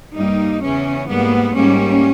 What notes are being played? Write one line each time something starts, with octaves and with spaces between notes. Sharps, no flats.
G2 G3 A#3 D#4
E2 C#3 E3 C#4
G#2 G3 A#3 B3
G#2 G3 A#3 C#4